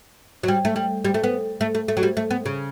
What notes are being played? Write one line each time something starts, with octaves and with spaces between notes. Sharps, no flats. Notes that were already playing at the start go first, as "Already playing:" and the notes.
F#3
G3
A3
G3
G3
A3
B3
A3
A3
A3
F#3
G3
A3
B3
C#3